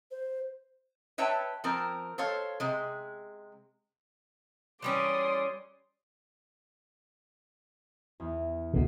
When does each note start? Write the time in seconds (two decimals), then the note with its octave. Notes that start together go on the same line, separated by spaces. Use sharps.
0.11 C5
1.18 B4 C#5 E5 G5 A5
1.64 F3 C4 A#4
2.18 A4 C5 C#5 F5
2.60 C3 G#3
4.82 E3 G3 C#4 D5 C6 D#6
8.20 E2
8.74 D2 B2